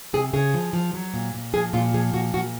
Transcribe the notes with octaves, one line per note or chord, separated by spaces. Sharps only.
C3 G#4
C#3 G#4
F3
F3
F#3
A#2
A#2
F3 G#4
A#2 F4
F3 G#4
A#2 F#4
A#2 F#4